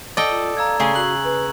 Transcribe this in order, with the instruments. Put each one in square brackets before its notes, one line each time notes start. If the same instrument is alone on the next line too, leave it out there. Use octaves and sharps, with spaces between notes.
[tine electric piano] A4 D5 [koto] D#5 G5
[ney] F4
[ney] F5 [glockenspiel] A#5 E6 G#6
[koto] C#3 G#4 [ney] A3 [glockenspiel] C#6
[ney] F#4 [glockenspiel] F#6 F#7
[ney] B4